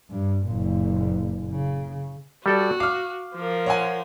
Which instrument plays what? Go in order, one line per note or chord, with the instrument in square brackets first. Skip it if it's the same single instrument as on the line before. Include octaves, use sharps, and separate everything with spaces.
[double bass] G2
F#1 A#2
C#3
[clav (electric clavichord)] G3 A4 D5 [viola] F#4
[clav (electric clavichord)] F5 [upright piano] D6 F6
[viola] F3 A#4
[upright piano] C#5 F#5 G#5